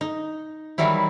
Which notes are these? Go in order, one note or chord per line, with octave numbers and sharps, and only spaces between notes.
D#4
D#3 E3 F#3 G3 E4